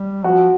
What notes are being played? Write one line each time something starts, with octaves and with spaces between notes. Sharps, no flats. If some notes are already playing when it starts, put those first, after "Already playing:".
Already playing: G3
F3 F#4